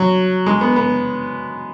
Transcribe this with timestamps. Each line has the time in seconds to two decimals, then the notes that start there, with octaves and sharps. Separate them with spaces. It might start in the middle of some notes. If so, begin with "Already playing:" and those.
Already playing: F#3
0.46 G#3
0.61 B3
0.76 B3